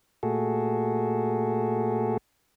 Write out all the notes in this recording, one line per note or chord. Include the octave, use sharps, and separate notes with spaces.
A#2 A3 F#4 G#4 A4